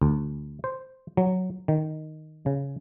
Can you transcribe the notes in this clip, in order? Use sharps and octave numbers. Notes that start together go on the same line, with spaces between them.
D2
C5
F#3
D#3
C#3